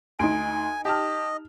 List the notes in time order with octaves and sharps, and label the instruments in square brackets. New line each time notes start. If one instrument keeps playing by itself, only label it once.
[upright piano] D2 C6 [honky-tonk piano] D#4 D7 [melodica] G#5
[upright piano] G4 A5 F6 [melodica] D#5